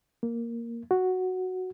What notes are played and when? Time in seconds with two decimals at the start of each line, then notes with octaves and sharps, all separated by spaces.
0.23 A#3
0.91 F#4